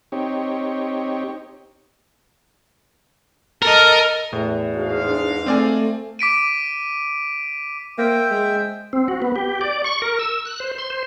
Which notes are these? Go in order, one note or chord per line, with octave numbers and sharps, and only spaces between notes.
C4 D#4 G4 C#5
A4 A#4 D#5
E2 A2
G#2 F#4 F5
D4
A3 C4 D5 G#5
D6 B6 D7 D#7
A#3 C5 E5 G5
G#3
C4
F#4
B3
G4
D5
C#6
A#4
E6
F#6
C5
C6
C5